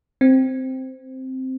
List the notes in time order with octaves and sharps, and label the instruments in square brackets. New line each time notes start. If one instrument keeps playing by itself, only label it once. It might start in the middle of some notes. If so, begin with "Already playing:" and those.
[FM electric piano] C4